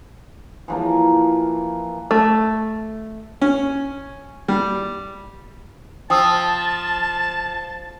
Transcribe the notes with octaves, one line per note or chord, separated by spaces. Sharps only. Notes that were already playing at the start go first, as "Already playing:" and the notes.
E3 F3 A#3
A3
C#4
G3
F3 G5 A5 D#6 E6